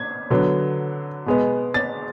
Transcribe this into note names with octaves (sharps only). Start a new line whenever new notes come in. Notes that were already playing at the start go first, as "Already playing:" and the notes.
Already playing: G#6
D3 F#3 B3
B2 G#3 B3
A6